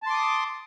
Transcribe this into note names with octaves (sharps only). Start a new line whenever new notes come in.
A5 C6 D6 D#6